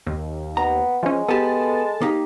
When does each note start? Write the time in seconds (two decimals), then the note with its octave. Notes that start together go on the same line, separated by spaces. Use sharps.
0.07 D#2
0.57 B3 A#5
1.03 F3 G#3 C#4
1.28 B3 G4 A4 A5
2.01 A#3 D#4 G4